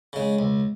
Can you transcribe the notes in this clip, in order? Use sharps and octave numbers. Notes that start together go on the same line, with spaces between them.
C#3 G#3
C#2